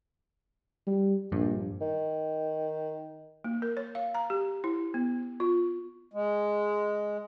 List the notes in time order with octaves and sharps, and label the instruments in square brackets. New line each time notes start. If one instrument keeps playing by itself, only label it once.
[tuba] G3
[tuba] A#1 [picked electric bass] G2
[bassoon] D#3
[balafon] A#3
A#4
C#5
F5
A#5
G4
E4
B3
F4
[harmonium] G#3